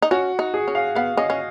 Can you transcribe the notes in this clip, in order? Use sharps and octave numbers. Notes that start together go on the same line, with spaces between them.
D#4
C#4 F#4
D#4
G#4
C#4
F5
B3 F5
C#4 D#5
C#4